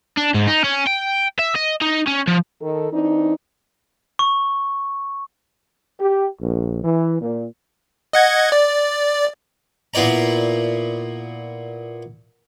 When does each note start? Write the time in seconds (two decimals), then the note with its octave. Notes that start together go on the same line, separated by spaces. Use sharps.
0.17 D4
0.34 G#2
0.47 D#4
0.64 C#4
0.87 G5
1.39 E5
1.55 D#5
1.81 D#4
2.07 C#4
2.28 F3
2.61 D#3 A4
2.91 E3 C4 D4 D#4
4.19 C#6
6.00 G4
6.42 A#1
6.84 E3
7.21 A#2
8.13 D#5 F#5 G#6
8.52 D5
9.94 A#2 B3 E4 D5 A#5